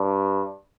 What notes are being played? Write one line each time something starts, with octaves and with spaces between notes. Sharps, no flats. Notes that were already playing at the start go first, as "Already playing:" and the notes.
Already playing: G2